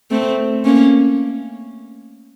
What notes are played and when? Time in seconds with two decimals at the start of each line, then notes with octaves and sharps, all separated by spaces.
0.11 A3 C4
0.65 A#3 C#4